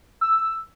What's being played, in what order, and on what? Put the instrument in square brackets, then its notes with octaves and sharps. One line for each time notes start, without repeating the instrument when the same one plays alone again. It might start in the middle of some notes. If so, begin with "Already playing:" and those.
[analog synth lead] E6